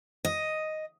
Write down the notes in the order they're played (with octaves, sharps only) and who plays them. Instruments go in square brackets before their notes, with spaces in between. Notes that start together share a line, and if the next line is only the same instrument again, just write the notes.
[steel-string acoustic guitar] D#5